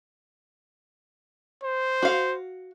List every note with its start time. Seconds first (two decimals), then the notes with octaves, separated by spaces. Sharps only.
1.64 C5
2.02 F#4 F5